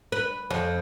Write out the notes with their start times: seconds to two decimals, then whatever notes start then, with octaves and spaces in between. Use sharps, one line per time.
0.12 B4
0.50 F2